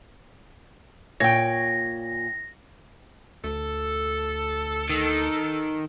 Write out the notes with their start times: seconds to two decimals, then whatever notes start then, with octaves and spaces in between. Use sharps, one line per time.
1.20 A#2 C#5 G5 A#6
3.44 D2 A4
4.89 D#3